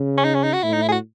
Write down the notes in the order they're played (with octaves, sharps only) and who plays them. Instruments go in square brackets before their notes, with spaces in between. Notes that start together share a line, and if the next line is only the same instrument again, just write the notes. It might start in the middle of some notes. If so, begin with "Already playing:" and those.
Already playing: [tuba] C#3
[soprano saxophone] C#4
D#4
C#4
D#4
F#4
[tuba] A2 [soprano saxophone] E4
[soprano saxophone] D#4
E4
G#4
F#4